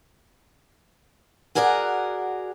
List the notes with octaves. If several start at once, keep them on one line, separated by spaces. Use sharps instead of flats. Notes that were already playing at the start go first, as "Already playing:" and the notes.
F#4 G#4 A#4 D5 D#5 F#5